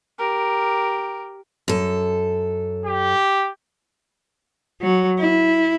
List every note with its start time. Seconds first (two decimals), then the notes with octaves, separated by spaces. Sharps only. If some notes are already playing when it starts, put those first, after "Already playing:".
0.19 G4 A#4
1.68 F#2 A4
2.85 G4
4.81 F#3
5.19 E4